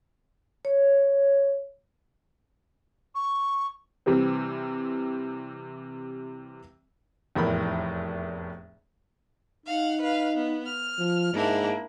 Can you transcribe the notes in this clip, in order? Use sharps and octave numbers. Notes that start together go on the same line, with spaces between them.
C#5
C#6
C3 E3 G3 C4
F1 E2 A2 A#4 B5
D#4 F5 F#5
B4 F5
B3
F6
F3
G#2 A#3 D4 E4